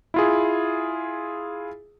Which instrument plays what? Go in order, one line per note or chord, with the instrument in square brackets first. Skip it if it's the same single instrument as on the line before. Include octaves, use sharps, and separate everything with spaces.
[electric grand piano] E4 F4 G#4